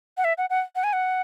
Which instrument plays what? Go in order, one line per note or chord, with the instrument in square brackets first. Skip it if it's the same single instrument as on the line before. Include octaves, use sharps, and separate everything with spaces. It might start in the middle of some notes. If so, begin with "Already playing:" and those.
[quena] F#5
E5
F#5
F#5
F#5
G#5
F#5